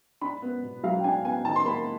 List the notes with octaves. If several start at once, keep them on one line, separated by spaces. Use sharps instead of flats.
D4 B5
B3
B2
F#3 F5
G5
D4 G#5
B3 G#5
D#3 A5
C6
A#3 B5